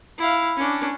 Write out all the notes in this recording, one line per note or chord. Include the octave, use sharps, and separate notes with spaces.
E4 F5
C#4 D4